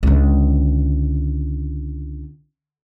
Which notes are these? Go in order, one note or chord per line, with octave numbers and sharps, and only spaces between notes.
C#2 D3